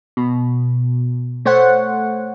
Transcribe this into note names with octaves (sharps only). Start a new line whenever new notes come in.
B2
A3 C5 C#5 F#5